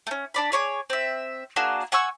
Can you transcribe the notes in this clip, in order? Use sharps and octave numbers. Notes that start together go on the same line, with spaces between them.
A3 C#4
D4 D5 B5
G#4 C#5 C#6 D6
C4 E5
A#3 D4 F#4 G#4
F#5 G#5 C#6 E6